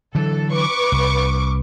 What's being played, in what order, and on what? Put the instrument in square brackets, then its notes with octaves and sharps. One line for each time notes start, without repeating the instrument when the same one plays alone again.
[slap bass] D3 E3 F#3 [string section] A4
[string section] B4 C#6 D6
[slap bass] C2